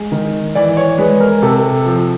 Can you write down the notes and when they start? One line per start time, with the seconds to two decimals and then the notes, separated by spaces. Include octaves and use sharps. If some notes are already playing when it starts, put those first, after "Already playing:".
Already playing: G#3
0.12 D#3
0.55 E3 D5
0.77 C#5
0.98 G#3 B4
1.20 A#4
1.42 C3 A4
1.86 F3